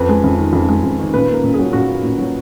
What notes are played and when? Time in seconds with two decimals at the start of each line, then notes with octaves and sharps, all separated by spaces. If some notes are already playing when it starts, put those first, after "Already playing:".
Already playing: F2 B4
0.09 G#3
0.24 F2
0.38 D#3
0.53 F2
0.68 G#3
0.83 F2
0.99 D#3
1.14 A#2 B4
1.29 A#3 A#4
1.44 A#2
1.54 F#3 G#4
1.73 A#2 F#4
1.88 A#3
2.04 A#2
2.18 F#3